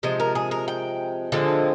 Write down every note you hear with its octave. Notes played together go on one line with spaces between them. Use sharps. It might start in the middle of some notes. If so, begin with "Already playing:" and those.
C3 F3 G#3 C5
A#4
G#4
A#4
G5
D3 F3 G#3 C4